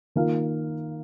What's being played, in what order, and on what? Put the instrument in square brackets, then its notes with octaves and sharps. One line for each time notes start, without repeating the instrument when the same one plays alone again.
[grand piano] D#3 A#3 F4 A#4 F5